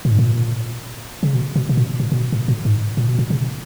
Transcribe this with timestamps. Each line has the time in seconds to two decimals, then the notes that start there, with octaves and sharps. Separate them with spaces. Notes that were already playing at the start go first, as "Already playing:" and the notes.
0.05 A#2
0.11 G#2
0.19 A#2
1.23 C#3
1.34 B2
1.56 B2
1.69 B2
1.77 A#2
2.00 A#2
2.12 A#2
2.16 B2
2.32 A#2
2.48 A#2
2.65 G#2
2.97 A#2
3.08 B2
3.19 A#2
3.30 C#3